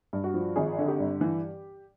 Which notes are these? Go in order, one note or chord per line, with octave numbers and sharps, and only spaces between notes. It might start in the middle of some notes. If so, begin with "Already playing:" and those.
G2
F#4
F3
G#1 G#4
D3
G4
G2
E3